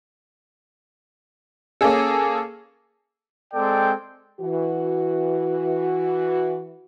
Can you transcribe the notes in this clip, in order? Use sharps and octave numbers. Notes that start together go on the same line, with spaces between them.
A#3 C#4 G#4 A4
G#3 C4 A4 D5 G5
E3 F#4